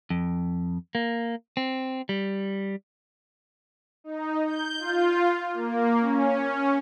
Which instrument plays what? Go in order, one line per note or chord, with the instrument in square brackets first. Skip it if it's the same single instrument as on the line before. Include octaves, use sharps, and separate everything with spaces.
[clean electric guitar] F2
A#3
C4
G3
[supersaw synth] D#4
G6
F4
A#3
C#4